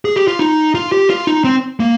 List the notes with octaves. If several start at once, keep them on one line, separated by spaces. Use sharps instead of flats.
G#4
G4
F4
D#4
F4
G4
F4
D#4
C4
A#3